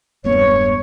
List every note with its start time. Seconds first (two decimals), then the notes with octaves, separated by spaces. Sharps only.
0.24 E1 G2 B3 C#5